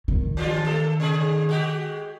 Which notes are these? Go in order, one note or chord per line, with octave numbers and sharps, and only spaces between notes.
D#3
E3 G3 F4
A3 A4
C3 G#4
G#3 F#4 G4